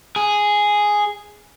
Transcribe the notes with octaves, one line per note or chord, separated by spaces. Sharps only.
G#4